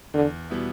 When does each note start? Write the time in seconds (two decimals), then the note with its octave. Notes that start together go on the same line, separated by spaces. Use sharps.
0.14 E2 D3
0.50 B2 G3 B3 E4